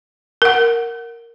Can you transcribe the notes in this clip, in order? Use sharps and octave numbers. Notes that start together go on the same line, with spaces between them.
A#4 F#5